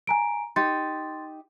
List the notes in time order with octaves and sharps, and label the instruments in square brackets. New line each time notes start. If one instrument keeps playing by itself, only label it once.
[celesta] G#5 A#5 D7
[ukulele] D#4 G4 [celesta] C6 A6